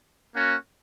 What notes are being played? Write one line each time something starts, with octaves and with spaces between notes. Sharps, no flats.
A#3 C#4 F#4